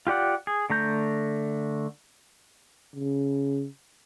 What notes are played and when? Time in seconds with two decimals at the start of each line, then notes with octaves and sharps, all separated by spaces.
0.07 F4 G4 D5 F#5
0.47 G#4
0.70 D3 A3 A#5 G6
2.95 C#3